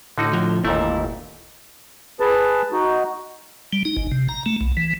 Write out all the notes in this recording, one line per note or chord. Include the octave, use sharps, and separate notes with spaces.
A2 D3 D#4 F#4
F3
G1 D#2 A#2 A3 E4
G#4 B4 A5
D#4 F#4
G3
D#4
G#1
C3
A#5
A3
B1
E3